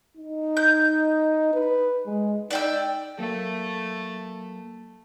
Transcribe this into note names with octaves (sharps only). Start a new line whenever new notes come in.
D#4
G6
B4
G#3
D#4 D5 G5 E6
F#3 A3 A#3